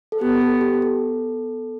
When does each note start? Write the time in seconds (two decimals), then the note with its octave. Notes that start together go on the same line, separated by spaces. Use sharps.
0.12 A4
0.20 B3 G4
0.41 A4
0.61 G4
0.82 A4